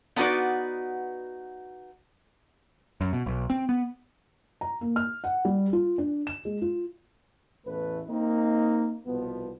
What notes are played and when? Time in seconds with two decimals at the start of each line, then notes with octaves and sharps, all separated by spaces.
0.16 B3 D4 D#4 F#4 B4 D5
3.01 F#2
3.13 B2
3.26 B1
3.50 C4
3.69 B3
4.61 A#5
4.81 A#3
4.96 F6
5.24 F#5
5.45 G3
5.73 F4
5.98 D4
6.27 E7
6.45 G#3
6.62 F4
7.66 A1 E2 A3 B4
8.08 A#3 C4 D#4
9.06 C2 B2 F3 B3